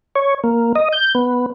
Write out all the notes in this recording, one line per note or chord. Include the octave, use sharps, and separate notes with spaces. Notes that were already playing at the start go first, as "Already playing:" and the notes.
C#5
A#3
D#5
G6
B3